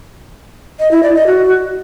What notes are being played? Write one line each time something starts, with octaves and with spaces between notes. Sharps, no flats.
D#5
E4
D5
D#5
F#4